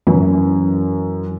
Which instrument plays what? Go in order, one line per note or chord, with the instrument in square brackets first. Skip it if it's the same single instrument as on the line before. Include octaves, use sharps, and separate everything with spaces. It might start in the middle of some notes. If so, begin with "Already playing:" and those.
[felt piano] F#2 [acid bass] E3